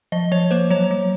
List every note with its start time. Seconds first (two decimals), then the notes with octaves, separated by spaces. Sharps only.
0.12 F3 D#5
0.31 F3 C#5
0.51 A#3 C5
0.70 F#3 C#5
0.91 F#3